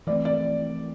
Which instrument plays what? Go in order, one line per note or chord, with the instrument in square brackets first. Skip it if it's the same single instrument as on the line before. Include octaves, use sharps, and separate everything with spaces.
[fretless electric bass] E3 A3 C4 [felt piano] D5
[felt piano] D5